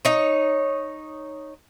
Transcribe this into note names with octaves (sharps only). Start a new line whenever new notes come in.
D#4 C#5